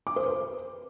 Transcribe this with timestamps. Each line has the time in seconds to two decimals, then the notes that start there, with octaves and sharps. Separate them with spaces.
0.07 D6
0.16 C5
0.26 B4